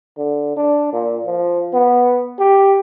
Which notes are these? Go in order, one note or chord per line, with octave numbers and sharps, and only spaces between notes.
D3
D4
A#2
F3
B3
G4